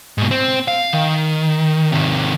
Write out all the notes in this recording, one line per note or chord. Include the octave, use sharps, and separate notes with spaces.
G#2 B2
C4
F5
D#3
C3 D#3